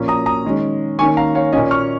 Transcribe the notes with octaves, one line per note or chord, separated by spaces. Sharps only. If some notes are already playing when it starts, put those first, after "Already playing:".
Already playing: A#2 F3 A#3 C#4
A#5 D#6
A#5 D#6
D#3 G#3 C#4
D#3 A#3 C#4 G#5 C#6
F5 A#5
C#5 F5
A#2 A#3 C#4 D#5 G#5
C#6 F6